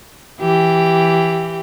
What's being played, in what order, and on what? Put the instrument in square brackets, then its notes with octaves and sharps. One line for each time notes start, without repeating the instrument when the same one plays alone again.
[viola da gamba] E3 G4